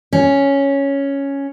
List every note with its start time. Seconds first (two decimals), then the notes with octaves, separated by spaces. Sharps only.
0.13 C#4